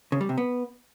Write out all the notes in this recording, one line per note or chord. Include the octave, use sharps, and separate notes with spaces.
C#3
G3
C3
B3